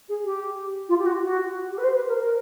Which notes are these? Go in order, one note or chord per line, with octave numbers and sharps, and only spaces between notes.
G#4
G4
F4
G4
F#4
F#4
G4
B4
C5
B4
A#4
A#4